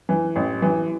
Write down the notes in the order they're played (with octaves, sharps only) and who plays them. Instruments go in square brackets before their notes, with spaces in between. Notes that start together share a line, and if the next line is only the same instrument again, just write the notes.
[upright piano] E3
A1
E3